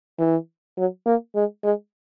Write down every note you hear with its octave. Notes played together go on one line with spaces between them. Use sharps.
E3
F#3
A#3
G#3
G#3